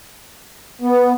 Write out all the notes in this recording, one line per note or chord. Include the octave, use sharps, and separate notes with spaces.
B3